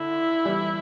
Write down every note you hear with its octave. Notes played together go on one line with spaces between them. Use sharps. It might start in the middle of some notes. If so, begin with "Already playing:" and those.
Already playing: D3 E4
E3 G3